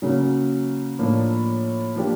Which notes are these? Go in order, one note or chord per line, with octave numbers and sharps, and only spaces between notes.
C#3 F#3 A#3 C#4 F#4
A2 F3 A#3 D4
F3 A#3 D4 G4